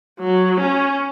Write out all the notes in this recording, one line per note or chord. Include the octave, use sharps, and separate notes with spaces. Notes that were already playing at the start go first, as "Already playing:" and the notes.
F#3
C#4